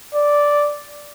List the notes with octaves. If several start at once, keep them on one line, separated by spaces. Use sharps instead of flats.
D5